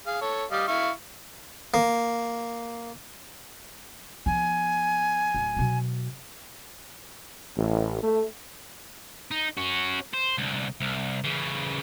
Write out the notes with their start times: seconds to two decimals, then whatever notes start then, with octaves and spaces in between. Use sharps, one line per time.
0.07 G#4 F5
0.21 A4 C#5
0.51 G3 D#5 F5
0.68 E4 F5 C#6
1.74 A#3
4.26 F3 B3 G#5
5.34 D1
5.56 B2 F#3
7.57 A1
8.02 A3
9.31 D#4
9.57 C#4 F#4
10.13 C5
10.38 C2 D3
10.81 C2
11.24 C#3 E3